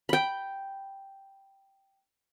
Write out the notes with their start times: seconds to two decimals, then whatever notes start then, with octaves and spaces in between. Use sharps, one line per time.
0.09 G5 B5